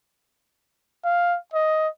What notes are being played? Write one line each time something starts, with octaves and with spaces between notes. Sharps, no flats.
F5
D#5